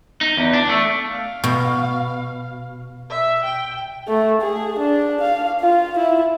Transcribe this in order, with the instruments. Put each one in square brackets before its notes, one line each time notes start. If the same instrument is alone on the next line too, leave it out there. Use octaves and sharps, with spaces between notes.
[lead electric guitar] D#4
E2
D4
A3
[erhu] F5
[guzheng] B2
[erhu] E5
G5
[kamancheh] A3
G#4
D4
F5
F4
E4